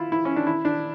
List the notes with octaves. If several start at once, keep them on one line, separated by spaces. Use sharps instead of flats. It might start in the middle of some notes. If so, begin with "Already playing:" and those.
Already playing: E4 F4
E4
C#4
D4
E4
D4